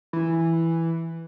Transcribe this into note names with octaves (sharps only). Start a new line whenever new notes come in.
E3